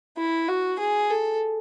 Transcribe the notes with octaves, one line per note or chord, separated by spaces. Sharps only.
E4
F#4
G#4
A4